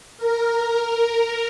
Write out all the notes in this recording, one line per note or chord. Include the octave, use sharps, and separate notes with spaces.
A#4